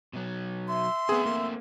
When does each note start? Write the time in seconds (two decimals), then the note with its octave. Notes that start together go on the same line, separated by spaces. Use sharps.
0.13 B2 F#3
0.68 E5 C6
1.09 A3 B3 C4 G#4
1.26 A#3